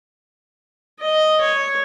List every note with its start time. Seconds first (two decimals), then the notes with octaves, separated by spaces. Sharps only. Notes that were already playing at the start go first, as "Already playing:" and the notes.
1.00 D#5
1.41 C#5